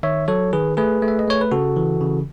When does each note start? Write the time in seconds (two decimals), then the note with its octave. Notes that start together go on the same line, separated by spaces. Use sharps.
0.03 D#3 C#5 E5
0.28 F#3 A4 C#5
0.53 D#3 G#4 B4
0.77 A3 G#4 B4
1.02 A3
1.08 E5
1.19 D#5
1.27 A3 C#5
1.41 B4
1.51 C#3 F#4 A4
1.76 E3
2.01 C#3